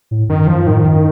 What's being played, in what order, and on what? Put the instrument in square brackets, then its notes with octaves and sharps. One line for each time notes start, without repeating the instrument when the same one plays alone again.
[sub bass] A2
[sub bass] F#2 [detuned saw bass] D#3
[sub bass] F#2 [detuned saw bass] F3
[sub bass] A2 [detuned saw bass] D#3
[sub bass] F#2